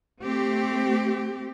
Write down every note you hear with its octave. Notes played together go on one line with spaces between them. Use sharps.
A3 C4 G4